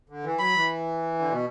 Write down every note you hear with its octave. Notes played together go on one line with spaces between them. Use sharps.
D3
E3
F#3 B5
E3
D3
B2